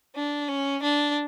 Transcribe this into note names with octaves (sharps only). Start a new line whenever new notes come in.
D4
C#4
D4